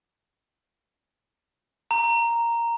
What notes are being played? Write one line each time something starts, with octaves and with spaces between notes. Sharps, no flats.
A#5